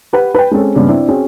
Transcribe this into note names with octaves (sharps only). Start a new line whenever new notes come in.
G4 B4 F#5
B4 G5
G#3 C4 C#4 A4
G2 A#2 C#3 B3 C#4 D4
C4 D4 E4 D5 E5
C4 C#4 F#4 G#4